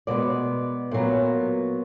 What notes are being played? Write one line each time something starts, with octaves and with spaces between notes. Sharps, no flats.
B2 G#3 B3 D5
A#2 F#3 B3